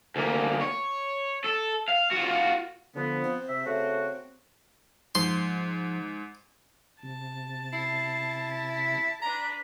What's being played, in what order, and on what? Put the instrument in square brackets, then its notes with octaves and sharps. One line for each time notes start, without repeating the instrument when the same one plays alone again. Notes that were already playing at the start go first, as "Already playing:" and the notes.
[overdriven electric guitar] D2 A#3
C#5
A4
F5
F4 F#4
[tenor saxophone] D3 [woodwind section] F3 B3
[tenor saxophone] C4
[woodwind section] C3 E5
C#3 A3 F#4
[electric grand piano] G#2 [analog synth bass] F3 [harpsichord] C6
[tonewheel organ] C3 [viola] A5
[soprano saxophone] E4 [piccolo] C7
[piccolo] B6
[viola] D4 B4 [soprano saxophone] A#5 [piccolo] B6